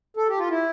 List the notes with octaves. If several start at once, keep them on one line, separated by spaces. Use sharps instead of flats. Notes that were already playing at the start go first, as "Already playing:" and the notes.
A4
G4
F4
E4